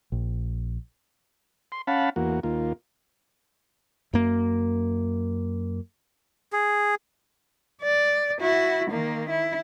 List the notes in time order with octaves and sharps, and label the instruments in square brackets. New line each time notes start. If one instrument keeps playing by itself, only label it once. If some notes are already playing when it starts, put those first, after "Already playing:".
[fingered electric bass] A#1
[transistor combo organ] C6
C#4 F5 F#5 A5 B5
E2 A#3 F#4
D#2 A#3 F4
[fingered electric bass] F#2 A#3
[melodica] G#4
[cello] D5
E4 F#4
D#3 A#3
E4